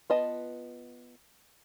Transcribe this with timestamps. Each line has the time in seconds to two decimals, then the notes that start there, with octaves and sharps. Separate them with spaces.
0.10 B3 F4 B4 D#5 A5